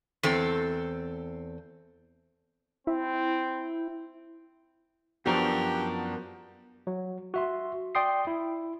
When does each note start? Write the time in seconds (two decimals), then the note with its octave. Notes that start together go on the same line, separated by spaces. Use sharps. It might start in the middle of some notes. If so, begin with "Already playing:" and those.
0.23 E2 C4 A4
2.87 C4 E4
5.26 F#2 F3 B3 D4 F#4 G4 A#4
6.87 F#3
7.34 F#4 E5 C6
7.95 D5 G5 C6 D#6 C7
8.27 E4